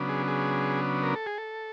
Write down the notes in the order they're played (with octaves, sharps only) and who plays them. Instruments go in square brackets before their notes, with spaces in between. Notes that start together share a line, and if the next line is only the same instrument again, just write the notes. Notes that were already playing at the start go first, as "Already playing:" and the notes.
Already playing: [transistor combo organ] C#3 F#3 B3 D4
G#4
G#4
A#4
A4
G#4
A4